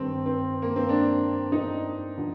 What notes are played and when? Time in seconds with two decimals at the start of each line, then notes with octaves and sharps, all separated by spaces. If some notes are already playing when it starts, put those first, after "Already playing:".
Already playing: G2 D#3 C4
0.26 C4
0.62 A#3
0.76 C4
0.89 D4
1.52 D#4
2.18 D3 F3